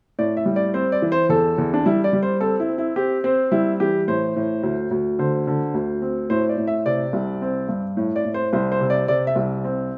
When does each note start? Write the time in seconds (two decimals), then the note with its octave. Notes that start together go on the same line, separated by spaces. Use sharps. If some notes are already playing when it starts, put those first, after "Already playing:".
0.19 A2 D5
0.37 E5
0.46 G3
0.56 D5
0.74 C4 C5
0.92 D5
1.02 E3
1.12 C5
1.29 E2 A4
1.58 E2
1.73 D4
1.86 G3 E4
2.04 D5
2.13 G3
2.23 C5
2.41 C4 A4
2.60 E4
2.69 C4
2.78 E4
2.96 C4 G4
3.24 C4 C5
3.52 G3 E4
3.80 E3 G4
4.08 A2 C5
4.36 A2
4.63 D2
4.91 D2
5.19 D3 C5
5.47 D3
5.74 D2
6.02 C4
6.30 A2 C5
6.49 D5
6.58 A2
6.67 E5
6.86 C3 D5
7.13 C2
7.42 C4
7.69 G2
7.97 A2
8.16 D5
8.25 A2
8.34 C5
8.53 C2 C5
8.72 C5
8.81 C3
8.90 D5
9.08 C3 D5
9.27 E5
9.36 C2
9.64 C4